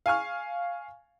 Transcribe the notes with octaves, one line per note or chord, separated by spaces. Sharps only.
F5 G#5 C#6 F6